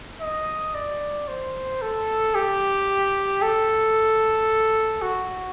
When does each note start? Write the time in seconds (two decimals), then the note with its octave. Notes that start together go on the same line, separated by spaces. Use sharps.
0.21 D#5
0.74 D5
1.28 C5
1.82 A4
2.35 G4
3.42 A4
5.02 F#4